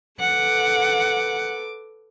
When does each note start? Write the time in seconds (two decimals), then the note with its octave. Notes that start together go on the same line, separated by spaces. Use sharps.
0.20 A4 B4 F#5 D6